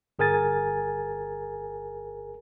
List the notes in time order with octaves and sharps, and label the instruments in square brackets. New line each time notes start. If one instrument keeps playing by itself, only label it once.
[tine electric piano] G1 G#4 A#4 G#5 A6